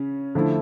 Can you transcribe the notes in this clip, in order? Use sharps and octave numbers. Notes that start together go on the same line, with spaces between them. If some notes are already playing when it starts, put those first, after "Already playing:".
Already playing: C#3 C#4
D3 F3 A3 E4